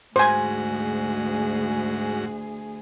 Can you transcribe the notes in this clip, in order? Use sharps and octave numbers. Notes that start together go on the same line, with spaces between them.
D2 G#2 F#4 G#4 C5 G#5